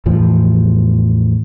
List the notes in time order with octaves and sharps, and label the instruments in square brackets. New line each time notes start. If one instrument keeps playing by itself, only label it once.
[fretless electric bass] E2 A2 E3 F3